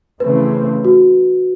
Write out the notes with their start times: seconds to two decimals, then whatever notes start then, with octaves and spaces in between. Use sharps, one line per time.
0.20 C#3 E3 A3 C4 B4
0.85 F#4